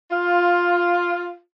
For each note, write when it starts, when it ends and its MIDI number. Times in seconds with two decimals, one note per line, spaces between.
0.10 1.36 65